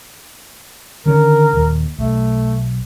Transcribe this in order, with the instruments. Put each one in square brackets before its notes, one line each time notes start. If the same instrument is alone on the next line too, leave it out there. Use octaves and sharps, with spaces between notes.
[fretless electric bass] D3 D#3 C#4 [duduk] A#4
[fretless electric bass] D#1 D#2
[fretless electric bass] B1 [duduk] A3